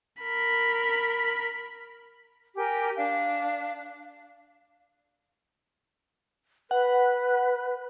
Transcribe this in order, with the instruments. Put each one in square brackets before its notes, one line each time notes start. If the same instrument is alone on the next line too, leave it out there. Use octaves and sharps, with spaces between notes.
[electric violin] A#4 B5
[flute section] G4 A#4 G#5
D4 F5
[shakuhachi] B4 [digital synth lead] F#5